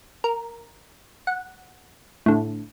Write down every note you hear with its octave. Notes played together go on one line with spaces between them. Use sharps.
A#4
F#5
A2 D3